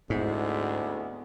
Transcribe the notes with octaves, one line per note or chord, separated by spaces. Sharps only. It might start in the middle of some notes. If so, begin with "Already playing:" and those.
D2 G#2 G#3 B3 C4 E4